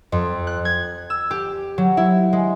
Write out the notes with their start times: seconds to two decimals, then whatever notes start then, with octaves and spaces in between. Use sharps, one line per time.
0.12 F2
0.47 F#6
0.65 G#6
1.10 E6
1.31 G4
1.78 F#3
1.97 E4
2.33 G#3